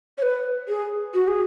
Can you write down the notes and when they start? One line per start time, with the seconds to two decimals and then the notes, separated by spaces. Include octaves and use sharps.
0.17 C#5
0.21 B4
0.67 G#4
1.13 F#4
1.27 G#4